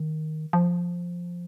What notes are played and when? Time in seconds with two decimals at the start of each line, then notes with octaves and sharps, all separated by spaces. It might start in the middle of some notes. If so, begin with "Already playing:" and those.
Already playing: D#3
0.53 F3